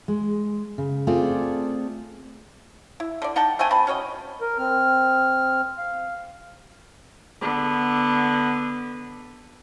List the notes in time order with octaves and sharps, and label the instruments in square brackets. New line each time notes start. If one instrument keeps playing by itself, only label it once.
[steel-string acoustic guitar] G#3
C#3
A3 C4 F4 G#4 A4 D5
[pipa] E4
D3 D5
D#4 F#5 G5 A5
A3 C4 G5 G#5
E3 C4 A5 B5
C#4 F#4 C#5 D#5
[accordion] A#4
C4 F6
F5
[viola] D3 B3